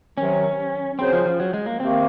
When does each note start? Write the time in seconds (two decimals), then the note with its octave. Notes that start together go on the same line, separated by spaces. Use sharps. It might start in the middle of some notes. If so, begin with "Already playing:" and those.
0.18 C3 D#3 F#3 C#4
0.99 C#3 F#3 C4 C#4 G#4 C5
1.13 F3
1.26 F3
1.40 F#3
1.54 G#3
1.66 A#3
1.80 C3 D#3 A#3 C4